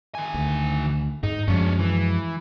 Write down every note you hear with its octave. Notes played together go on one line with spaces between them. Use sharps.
D#3 G#5
D2
G#2 D#4
F#2 F3 G#3 C#4 D4
E3